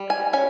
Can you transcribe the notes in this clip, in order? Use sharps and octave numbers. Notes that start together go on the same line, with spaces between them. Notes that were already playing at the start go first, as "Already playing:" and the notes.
Already playing: G3
G#5
C#4 G#5